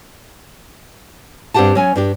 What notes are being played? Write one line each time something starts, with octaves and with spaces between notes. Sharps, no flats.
G2 C4 D4 G4 F#5 A5
F#3 C#4 G#5
G2 D4 G4